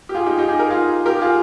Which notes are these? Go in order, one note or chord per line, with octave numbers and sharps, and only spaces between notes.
G4
F4 G#4
D#4 G4
D#4 G4
G#4
A#4
F4 G#4
G4 A#4
F4 G#4